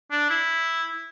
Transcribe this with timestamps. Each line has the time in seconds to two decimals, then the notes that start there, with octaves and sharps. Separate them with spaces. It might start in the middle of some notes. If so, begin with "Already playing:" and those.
0.11 D4
0.30 E4